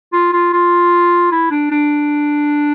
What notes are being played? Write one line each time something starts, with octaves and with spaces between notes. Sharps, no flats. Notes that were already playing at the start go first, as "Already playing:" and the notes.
F4
F4
F4
E4
D4
D4